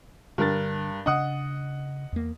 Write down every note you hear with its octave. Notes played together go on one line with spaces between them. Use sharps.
G2 D3 A#4 A6
C#3 D4 D#5 F#5 D#6
E2 A#3